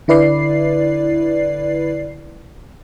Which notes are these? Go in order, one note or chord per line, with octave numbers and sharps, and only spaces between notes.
D3 E4 B4 D5 C7